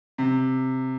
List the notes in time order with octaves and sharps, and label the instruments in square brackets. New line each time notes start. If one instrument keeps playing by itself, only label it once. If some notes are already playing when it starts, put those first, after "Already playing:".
[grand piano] C3